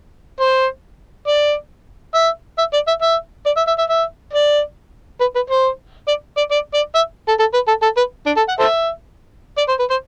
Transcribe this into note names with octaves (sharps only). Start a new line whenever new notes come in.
C5
D5
E5
E5
D5
E5
E5
D5
E5
E5
E5
E5
D5
B4
B4
C5
D5
D5
D5
D5
E5
A4
A4
B4
A4
A4
B4
D4
A4
F#5
A4 C5 E5
D5
C5
B4
C5